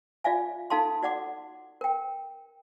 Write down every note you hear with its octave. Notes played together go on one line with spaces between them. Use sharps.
F4 D5 E5 F5 G#5
D#4 A4 F5 A5 C6
F#4 D5 F#5 D6
A#4 G5